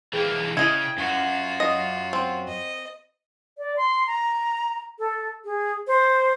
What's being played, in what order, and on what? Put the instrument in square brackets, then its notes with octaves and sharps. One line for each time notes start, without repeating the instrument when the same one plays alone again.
[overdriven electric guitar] E3 A#3 [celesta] G#4 [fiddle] G5
[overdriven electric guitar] C#3 [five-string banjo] E4 D#5 [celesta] G#6
[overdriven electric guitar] F#2 [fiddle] F4 F#4
[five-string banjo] D#5
C4
[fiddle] D#5
[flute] D5
C6
A#5
A4
G#4
C5